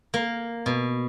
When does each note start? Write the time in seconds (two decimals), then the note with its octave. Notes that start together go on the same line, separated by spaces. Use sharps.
0.14 A#3
0.66 B2